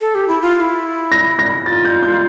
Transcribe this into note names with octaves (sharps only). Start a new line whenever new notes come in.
A4
G4
E4
F4
F4
E4
A#6
A#6
F4 A6
G6
G6